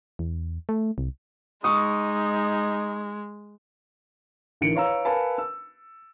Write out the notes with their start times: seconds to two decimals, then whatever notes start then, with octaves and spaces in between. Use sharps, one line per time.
0.19 E2
0.69 A3
0.98 C2
1.64 G#3 D#4 C#6 D#6
4.61 A1 D3 D#3 A#4 C#7 D7
4.74 B4 C#5 F5 A#5 E6
5.05 A#4 B4 F5 G#5 A5 B5
5.38 E6